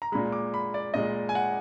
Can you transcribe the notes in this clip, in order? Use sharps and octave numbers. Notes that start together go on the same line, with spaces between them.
A#5
A#2 G#3 B5
D6
B5
D5
A#2 G#3 D#5
G#5
F#5